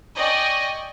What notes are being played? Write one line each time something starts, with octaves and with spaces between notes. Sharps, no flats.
D5 D#5 G5 G#5 C#6